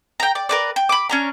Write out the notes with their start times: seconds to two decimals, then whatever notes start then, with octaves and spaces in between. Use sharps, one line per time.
0.20 G5 A#5
0.35 D5
0.49 A#4 B4 D5
0.76 G5
0.89 B5 D6
1.10 C#4 D4 A#5